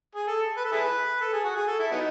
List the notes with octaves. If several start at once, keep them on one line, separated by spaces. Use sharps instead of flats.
G#4
A4
B4
A4
E4 G#4 B4
A4
G#4
F#4
G#4
A4
E4
F#3 B3 D#4